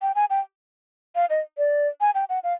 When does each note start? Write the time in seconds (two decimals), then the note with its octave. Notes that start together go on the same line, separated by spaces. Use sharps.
0.02 G5
0.15 G#5
0.30 G5
1.15 F5
1.30 D#5
1.58 D5
2.01 G#5
2.15 G5
2.29 F#5
2.44 F5